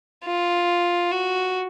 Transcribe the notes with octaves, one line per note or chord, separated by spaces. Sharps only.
F4
F#4